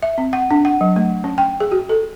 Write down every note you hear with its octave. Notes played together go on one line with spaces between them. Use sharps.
E5
C4
F#5
D4
F#5
F#3
A3
C#4
G5
G#4
F#4
A4